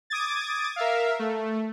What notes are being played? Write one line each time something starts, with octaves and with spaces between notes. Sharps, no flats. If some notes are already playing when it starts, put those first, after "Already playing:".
D6 D#6 G#6 A6
A#4 E5 F5
A3